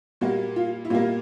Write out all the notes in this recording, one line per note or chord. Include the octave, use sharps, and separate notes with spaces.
A#2 G3 A#3 F#4
F4
E4
A#2 G3 A#3 F4